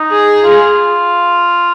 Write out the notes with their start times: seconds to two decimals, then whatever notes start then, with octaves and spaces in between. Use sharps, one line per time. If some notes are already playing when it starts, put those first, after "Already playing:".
Already playing: D#4
0.11 G#4
0.41 F4